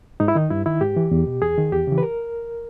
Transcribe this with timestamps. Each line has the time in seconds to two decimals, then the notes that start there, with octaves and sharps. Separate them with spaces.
0.20 G#2 D#4
0.28 E4
0.35 D#3 D#4
0.50 G2 E4
0.66 D#3 E4
0.81 G#2 G4
0.96 E3
1.11 E2
1.27 B2
1.42 E2 G#4
1.57 D#3
1.72 E2 G4
1.87 C#3 E3
1.98 B4
2.03 A#4